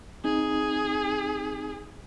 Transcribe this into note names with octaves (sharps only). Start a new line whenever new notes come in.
C4 D#4 G#4